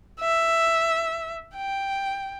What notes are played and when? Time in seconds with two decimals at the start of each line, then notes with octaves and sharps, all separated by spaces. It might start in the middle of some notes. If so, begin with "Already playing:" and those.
0.20 E5
1.56 G5